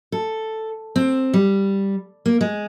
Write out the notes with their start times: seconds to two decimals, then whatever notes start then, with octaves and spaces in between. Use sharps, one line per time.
0.12 A4
0.96 C4
1.34 G3
2.26 A#3
2.41 G#3